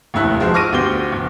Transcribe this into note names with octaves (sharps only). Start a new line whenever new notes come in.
F1 D#2 A3 E4 E6 F#6
F3 G#3 D#4 F#4 C5
C#6 D6 F6 A#6 D7 D#7
D2 B3 G4 C5 G7
F1